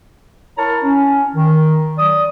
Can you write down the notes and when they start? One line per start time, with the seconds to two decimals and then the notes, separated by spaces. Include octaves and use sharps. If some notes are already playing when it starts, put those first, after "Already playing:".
0.58 E4 A#4 C#5 A5 A#5
0.83 C#4
1.35 D#3
1.97 F#3 D5 D#6